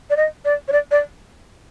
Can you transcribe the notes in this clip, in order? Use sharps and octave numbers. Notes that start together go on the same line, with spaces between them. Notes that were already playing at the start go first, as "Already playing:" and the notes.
D5
D#5
D5
C#5
D5
D5